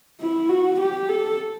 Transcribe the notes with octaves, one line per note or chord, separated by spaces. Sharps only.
E4
F#4
G4
A4